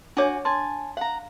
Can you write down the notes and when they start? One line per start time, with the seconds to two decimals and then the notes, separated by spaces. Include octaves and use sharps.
0.17 D4 F#4 C#5 G#5 D6
0.45 G#5 A5 C6
0.97 F5 F#5 A#5